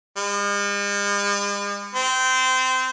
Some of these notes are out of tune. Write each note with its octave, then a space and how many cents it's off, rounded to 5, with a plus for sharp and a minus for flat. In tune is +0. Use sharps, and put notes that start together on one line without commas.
G#3 -45
C4 -20